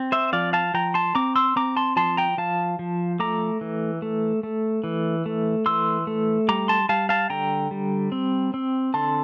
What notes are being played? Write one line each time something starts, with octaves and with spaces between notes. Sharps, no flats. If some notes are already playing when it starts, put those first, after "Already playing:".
Already playing: C4
C5 E5
F3 D5 F5
F5 A5
F3 G5 A#5
A5 C6
C4 A#5 D6
C6 E6
C4 A#5 D6
A5 C6
F3 A5 C6
G5 A#5
F3 F5 A5
F3
A3 A#5 D6
E3
A3
A3
E3
A3
E3 C6 E6
A3
G3 A#5 D6
A5 C6
G3 F5 A5
F5 A5
D3 G5 A#5
G3
C4
C4
D3 A5 C6